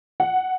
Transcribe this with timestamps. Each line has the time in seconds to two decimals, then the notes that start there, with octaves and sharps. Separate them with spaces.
0.20 F#5